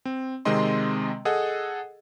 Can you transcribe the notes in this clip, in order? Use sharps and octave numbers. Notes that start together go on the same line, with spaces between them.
C4
C3 D#3 G#3 C4 D#5 C6
G#4 A4 D#5 F#5